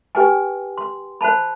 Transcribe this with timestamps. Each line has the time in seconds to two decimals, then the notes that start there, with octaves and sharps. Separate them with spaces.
0.15 G4 B4 G5 G#5
0.78 C6
1.21 C5 F#5 A5 B5